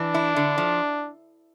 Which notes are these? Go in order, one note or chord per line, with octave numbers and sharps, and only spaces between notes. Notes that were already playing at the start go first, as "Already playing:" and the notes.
Already playing: E3 D4
E4
D3
F3